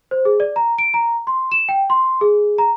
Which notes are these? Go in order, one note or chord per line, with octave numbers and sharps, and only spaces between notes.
C5
G#4
D5
A#5
D7
A#5
C6
E7
G5
C6
G#4
A#5